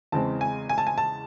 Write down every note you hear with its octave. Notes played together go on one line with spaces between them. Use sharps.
E2 C#3 E3 G#3 C4 A5
G#5
G#5
A5
G#5
A5